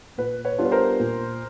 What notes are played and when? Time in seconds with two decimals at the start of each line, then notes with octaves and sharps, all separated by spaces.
0.18 A#2 B4
0.45 B4 C#5
0.58 G3 B3 D4 F4
0.65 B4
0.71 A#4 C5
1.00 A#2